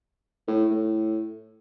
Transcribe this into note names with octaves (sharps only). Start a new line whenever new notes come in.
A2
A2